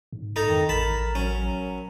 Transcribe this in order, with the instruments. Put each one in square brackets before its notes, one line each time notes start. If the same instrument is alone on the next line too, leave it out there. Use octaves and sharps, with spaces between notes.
[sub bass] G#2
[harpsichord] D#4 A4 A#5
[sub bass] F2 [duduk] D#3
[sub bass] A1 [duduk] A#4 [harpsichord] A5 B5
[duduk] F#3 [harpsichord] C#4